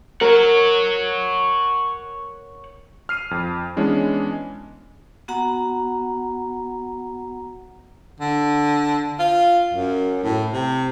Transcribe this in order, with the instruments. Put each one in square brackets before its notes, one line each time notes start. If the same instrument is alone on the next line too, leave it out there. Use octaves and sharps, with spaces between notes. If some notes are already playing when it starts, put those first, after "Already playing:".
[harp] A#4 [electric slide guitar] C#5 F#5
[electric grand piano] F6 C7 D#7
F2
E3 G#3 B3 C#4 D4
[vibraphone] B3 F#4 F#5 A#5
[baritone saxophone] D3
F4
F#2
A2
C3